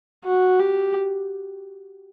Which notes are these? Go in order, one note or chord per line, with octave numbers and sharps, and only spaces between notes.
F#4
G4